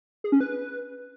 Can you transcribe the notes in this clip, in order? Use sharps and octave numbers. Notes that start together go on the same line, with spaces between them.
G#4
C#4
B4